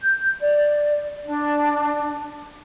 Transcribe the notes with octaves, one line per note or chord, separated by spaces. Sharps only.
G6
D5
D4